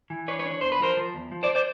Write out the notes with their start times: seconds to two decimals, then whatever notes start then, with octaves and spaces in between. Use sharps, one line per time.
0.10 E3
0.28 D4 B4 C#5
0.39 B4 C#5
0.46 D4
0.51 C#5
0.61 E2 C5
0.72 B4
0.80 F3 A#4 C5
0.97 F3
1.15 E2
1.32 F3
1.43 C5 D5
1.55 C5 D5